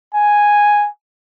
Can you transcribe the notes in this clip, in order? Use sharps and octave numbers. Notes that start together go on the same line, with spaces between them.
G#5